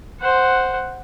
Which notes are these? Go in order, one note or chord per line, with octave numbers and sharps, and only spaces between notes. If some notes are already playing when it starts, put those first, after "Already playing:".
C5 F#5